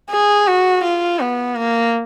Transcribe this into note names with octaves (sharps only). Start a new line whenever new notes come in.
G#4
F#4
F4
B3
A#3